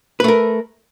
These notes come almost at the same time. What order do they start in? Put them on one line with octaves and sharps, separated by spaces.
B4 A3 A#4